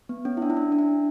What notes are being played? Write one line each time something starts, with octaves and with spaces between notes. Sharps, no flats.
B3
C#4
E4
D4
E4
D4
D4
E4